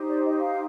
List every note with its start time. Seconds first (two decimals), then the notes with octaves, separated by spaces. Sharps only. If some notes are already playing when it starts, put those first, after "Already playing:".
Already playing: D#4 G4 C5
0.09 D5
0.25 D#5
0.40 F5